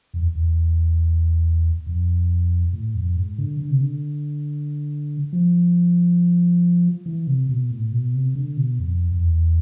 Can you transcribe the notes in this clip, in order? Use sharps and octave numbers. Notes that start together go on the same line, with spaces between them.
F2
E2
E2
F2
A2
F2
G#2
D3
D3
C3
D3
F3
E3
C3
B2
A2
B2
C3
D3
B2
F2
F2
E2